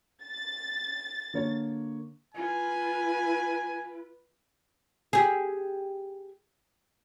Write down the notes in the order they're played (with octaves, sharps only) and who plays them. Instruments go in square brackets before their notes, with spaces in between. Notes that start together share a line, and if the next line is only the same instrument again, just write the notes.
[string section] A6
[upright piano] D3 A#3 C#5
[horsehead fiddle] F4 B4 [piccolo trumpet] G#5
[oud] G4 G#4